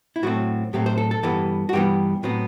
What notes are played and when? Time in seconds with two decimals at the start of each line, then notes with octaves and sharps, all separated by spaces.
0.16 E4
0.23 A2 F#3 A3 C4 F#4
0.73 A2 F#3 A3 C4 G4
0.86 C5
0.98 A4
1.11 A4
1.23 G2 E3 G3 B3 A4
1.69 F#4
1.73 G2 E3 G3 B3 G4
2.23 A2 F#3 B3 C4